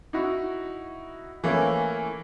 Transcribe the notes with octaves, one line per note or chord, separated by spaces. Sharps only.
D#4 E4 F#4
E3 A3 A#3 C#4 E4